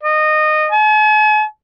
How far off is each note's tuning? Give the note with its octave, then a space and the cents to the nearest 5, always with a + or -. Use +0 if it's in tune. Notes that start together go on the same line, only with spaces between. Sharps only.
D#5 -20
G#5 +45